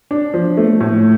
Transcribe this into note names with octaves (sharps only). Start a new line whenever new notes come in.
D4
F3
A3
A2